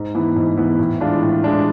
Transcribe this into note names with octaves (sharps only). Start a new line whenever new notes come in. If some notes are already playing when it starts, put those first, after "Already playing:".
Already playing: G#2
E3 B3 E4
G#2
E3 B3 E4
A2
E3 G#3 D4 F4
A2
E3 G#3 D4 F4